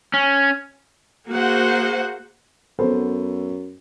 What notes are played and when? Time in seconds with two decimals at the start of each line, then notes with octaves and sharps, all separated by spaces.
0.14 C#4
1.27 A#3 F#4 G#4 C5 F#5
2.79 F#2 B3 A4 C5